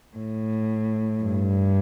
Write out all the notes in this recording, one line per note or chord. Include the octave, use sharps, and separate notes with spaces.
A2
G2